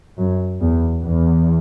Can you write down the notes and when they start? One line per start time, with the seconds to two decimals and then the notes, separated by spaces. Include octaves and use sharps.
0.19 F#2
0.60 E2
1.03 E2